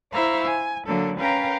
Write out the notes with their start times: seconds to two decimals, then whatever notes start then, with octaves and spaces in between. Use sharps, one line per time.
0.13 E4 C5 E5 F5 A#5 C#6
0.45 G#5
0.86 D3 F#3 A#3 A4
1.18 C#4 A#4 B4 F5 G5 A#5